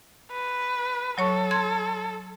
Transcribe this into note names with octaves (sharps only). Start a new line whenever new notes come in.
B4
F#3 A4 C#5 C#6
C6 G#6